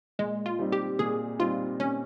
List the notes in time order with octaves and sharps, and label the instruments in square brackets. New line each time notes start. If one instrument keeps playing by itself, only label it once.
[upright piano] A#2 [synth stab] G#3
[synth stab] F4
[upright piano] G3 C4 D#4
[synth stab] G4
[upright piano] A#2 [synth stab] G#4
[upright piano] G3 C4 D#4 [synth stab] F4
[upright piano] A#2 [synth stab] C#4